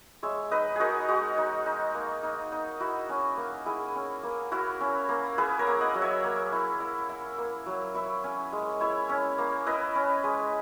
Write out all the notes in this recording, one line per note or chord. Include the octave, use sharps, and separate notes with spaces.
G#3 C#5 E5
D#4 B4 D#5
D#4 F#4 G#4 A#4
G#3 F#4
D#4
D#4
A#3
D#4
D#4
E4 F#4
C#4
A#3
E4 G#4
C#4
A#3
E4 F#4 A#4
C#4
A#3
E4 G#4 B4
A#4 C#5
A#3
D#5 F#5
F#3
C#5 E5
A#3
E4
E4
E4
A#3
F#3
E4 C#5 E5
C#4
G#3
E4 C#5 E5
C#4
A#3
E4 B4 D#5
C#4
G#3